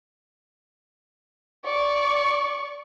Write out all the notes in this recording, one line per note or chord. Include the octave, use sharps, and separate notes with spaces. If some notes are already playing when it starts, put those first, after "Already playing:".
D5 C#6